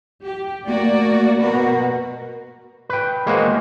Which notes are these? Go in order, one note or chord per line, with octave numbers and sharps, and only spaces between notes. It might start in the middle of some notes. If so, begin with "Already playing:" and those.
G4
A3 A#3 F#4 D5
B2 F#4 A#4 B4
B4 G5
G#3 A#3 F#4 C5 D#5